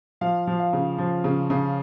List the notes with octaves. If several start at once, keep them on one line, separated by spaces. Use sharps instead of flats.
F3 F5
F3
F5
C#3
F3
C#3
C#3